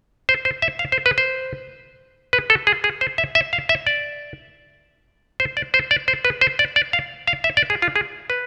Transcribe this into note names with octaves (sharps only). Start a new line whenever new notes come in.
C5
C5
E5
F5
C5
B4
C5
B4
A4
G#4
G#4
C5
E5
E5
F5
E5
D5
C5
D5
C5
D5
C5
B4
C5
D5
D5
F5
F5
E5
D5
G#4
F4
G#4
B4